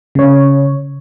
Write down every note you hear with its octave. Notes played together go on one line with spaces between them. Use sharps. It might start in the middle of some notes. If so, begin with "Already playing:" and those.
C#3 C#5